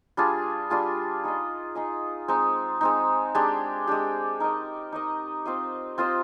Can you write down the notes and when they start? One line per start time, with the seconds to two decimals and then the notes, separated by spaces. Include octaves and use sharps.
0.17 G3 D4 F4 G#4
0.70 G3 D4 F4 G#4
1.24 D#4 G#4 D#5
1.75 D#4 G#4 D#5
2.28 G#3 C4 D#4
2.81 G#3 C4 D#4
3.35 G#3 D4 G4
3.87 G#3 D4 G4
4.40 D#4 A#4 D#5
4.92 D#4 A#4 D#5
5.46 C4 F4 C5 D#5
5.98 C4 F4 C5 D#5